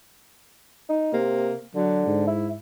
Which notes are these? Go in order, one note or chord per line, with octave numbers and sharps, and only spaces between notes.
D#4
C3 A#3
D3 F#3
G#2
E4